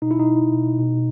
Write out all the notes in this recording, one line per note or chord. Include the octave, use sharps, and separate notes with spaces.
B2 D#4
E4
D#4
B2
B2
B2